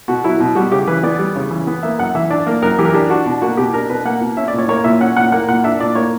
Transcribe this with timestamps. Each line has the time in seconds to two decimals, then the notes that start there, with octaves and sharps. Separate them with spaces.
0.08 B2 F#4
0.24 F#3 E4
0.40 B2
0.55 G3 F#4
0.72 C#3 G4
0.87 E3 B4
1.03 B3 D5
1.19 G3
1.36 C#3
1.51 E3
1.67 B3
1.83 A#3 E5
1.99 F#2 F#5
2.15 E3 E5
2.30 D4 D5
2.46 A#3 A#4
2.62 F#2 A#4
2.78 E3 G4
2.85 A#4
2.93 D4 G4
3.10 D4 F#4
3.26 B2
3.42 A#3 F#4
3.57 B2 G4
3.73 D4 A#4
3.90 B2 B4
4.05 A#3 F#5
4.21 B2
4.37 C#4 E5
4.48 D5
4.53 A#2
4.58 C#5
4.69 A#3 C#5
4.84 A#2 E5
5.01 C#4 F#5
5.16 A#2 F#5
5.32 A#3 F#5
5.48 A#2 F#5
5.64 D4 E5
5.80 A#2 D5
5.95 A#3 C#5